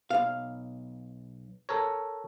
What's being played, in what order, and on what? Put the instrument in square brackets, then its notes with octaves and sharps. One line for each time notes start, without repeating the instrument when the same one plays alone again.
[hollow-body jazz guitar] B1 F5
[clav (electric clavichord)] A4 A#4 C#5